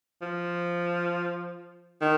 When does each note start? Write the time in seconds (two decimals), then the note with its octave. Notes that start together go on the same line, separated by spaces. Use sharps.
0.21 F3
2.01 D#3